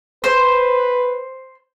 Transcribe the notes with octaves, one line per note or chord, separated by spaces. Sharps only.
B4 C5